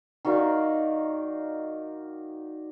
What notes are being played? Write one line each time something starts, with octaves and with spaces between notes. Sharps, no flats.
D#3 F#4 D5 F5